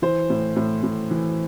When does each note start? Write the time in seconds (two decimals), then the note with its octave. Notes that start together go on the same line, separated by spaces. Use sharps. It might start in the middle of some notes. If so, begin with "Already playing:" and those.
0.02 E3 C5
0.30 A2
0.56 A2
0.83 A2
1.11 E3